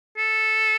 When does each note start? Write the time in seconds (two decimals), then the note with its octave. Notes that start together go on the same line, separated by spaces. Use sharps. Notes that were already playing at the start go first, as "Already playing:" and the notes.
0.18 A4